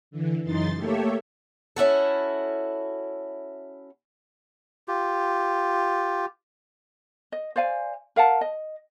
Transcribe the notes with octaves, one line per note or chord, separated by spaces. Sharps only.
D3 E3
F#2 C#3 E3 D#4 C6 A6
A3 A#3 G4 A4 C#5 E5
C#4 E4 F#4 A4
F4 G4
D#5
C5 D5 F5 G#5
A#4 F5 F#5 A5
D#5